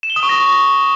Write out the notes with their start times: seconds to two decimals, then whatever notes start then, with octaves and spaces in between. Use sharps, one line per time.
0.03 E7
0.10 G7
0.16 D#6
0.23 C#6
0.29 A#6